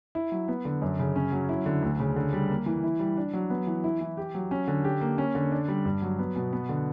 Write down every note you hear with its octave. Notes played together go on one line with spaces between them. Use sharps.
E4
F#3
B3
D3
F#2
C#3
C#4
F#3
E4
D3
D2
C#3
D3
G3
A#3
E3
E4
G3
D4
F#3
B3
E3
E4
E3
G4
F#3
C#4
D3
G4
A#3
C#4
D3
D4
G3
G2
F#3
B3
B2
B3
D3